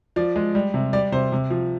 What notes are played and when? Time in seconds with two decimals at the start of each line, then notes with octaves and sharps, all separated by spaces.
0.16 F3 D5
0.36 G#3
0.55 G3
0.74 C3
0.93 G3 D5
1.12 C3 C5
1.32 C3
1.50 F3